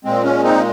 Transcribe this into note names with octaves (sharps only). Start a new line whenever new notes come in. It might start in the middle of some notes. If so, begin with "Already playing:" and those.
A#2 G#3 C4
C#4
C4 D#4